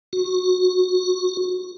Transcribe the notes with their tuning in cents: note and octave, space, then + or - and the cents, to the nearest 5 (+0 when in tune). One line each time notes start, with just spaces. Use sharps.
F#4 -20